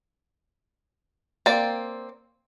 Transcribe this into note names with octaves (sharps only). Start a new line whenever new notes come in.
A#3 C4 D5